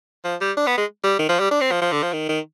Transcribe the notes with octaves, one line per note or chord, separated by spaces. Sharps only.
F3
G3
D4
B3
G#3
G3
D#3
F3
G3
D4
C4
F3
F3
D3
F3
D#3
D#3